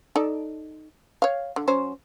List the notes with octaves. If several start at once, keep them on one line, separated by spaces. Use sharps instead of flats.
D#4 A4 D5
C#5 F5
D3
F#3 C#4 C5